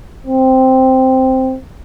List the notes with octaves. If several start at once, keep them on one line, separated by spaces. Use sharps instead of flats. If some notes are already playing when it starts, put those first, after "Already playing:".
C4